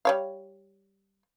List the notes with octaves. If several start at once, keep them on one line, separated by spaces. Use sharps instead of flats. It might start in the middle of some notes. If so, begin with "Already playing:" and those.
G3 C#5 F5